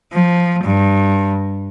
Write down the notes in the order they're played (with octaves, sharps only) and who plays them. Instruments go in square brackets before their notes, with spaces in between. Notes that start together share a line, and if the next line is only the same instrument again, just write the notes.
[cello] F3
G2